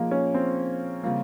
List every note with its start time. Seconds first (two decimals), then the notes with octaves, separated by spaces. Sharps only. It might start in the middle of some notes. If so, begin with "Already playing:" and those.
Already playing: A#2 F3 A#3 D#4 G#4
0.11 C#4
0.34 C4
1.03 C#3 G3 A#3 C4 F4